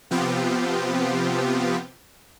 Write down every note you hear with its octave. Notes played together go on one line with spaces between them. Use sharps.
C3 F3 B3 C4 F4 G4